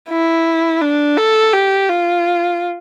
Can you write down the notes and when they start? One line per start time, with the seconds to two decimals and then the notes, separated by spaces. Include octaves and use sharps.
0.09 E4
0.81 D4
1.18 A4
1.53 G4
1.89 F4